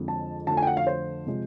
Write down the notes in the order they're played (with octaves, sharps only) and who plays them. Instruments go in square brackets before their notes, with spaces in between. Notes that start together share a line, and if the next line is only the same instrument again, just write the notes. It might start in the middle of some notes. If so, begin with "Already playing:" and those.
Already playing: [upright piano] F2 D3 F3 G#3 C4
A5
F2 D3 F3 A3 A5
G#5
G5
F#5
F5
C5
C3 F3 G#3